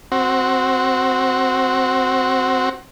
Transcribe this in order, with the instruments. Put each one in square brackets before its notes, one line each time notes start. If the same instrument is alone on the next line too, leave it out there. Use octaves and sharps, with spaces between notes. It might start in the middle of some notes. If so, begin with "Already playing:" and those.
[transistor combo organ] C4 F#4